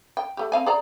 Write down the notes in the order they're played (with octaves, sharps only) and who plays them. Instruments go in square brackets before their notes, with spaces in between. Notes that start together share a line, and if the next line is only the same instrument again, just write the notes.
[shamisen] G5
A3 G4
C4 F5 G#5
G#4 D5 A#5